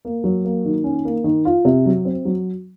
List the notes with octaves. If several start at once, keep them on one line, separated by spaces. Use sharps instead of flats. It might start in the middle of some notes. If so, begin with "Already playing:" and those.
A#3
F#3
A#3
D#3
C#4
A#3
D#3
F4
C3
F#3
C4
F#3